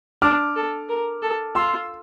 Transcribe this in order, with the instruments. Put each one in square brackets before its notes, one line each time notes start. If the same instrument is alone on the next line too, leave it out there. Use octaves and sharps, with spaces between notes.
[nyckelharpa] D4 [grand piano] D6 F6
[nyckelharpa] A4
A#4
A4
[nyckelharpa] F4 [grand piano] C6 E6